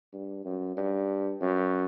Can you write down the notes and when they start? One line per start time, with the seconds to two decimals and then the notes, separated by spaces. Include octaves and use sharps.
0.13 G2
0.45 F#2
0.77 G2
1.41 F#2